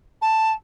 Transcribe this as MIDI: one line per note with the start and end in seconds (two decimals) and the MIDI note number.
0.22 0.52 81